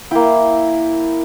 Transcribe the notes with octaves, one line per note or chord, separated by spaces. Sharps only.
A#3 E4 G5